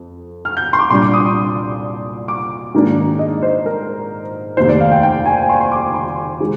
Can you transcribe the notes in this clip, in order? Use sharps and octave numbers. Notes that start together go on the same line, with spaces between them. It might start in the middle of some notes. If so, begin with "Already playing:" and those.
Already playing: F2
F6
G6
C6
D6
C2 A#2 G3 D4 C6
D6
D#6
C6
D6
G#2 D#3 A#3 D4
D#5
C5
A#4
F1 D#2 D#3 C5
D5
F5
G5
G5
G#5
C6
C6
D6
C6
D#3 G#3